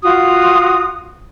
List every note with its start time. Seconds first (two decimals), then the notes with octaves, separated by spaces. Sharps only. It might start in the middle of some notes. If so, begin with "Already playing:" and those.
0.04 F4 F#4 D#6